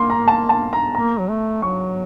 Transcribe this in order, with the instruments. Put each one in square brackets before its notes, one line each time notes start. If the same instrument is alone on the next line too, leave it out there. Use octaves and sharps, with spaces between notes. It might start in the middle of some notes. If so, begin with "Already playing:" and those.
Already playing: [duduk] A#3 [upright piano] C6
[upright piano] A#5
A5
A5
A#5
[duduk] A#3 [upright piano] A#5
[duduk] F#3
A3
[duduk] F#3 [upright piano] C#6